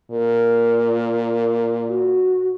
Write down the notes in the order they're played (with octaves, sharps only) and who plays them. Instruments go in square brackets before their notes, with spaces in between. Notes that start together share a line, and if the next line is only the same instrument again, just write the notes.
[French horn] A#2 [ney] A#4
[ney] F#4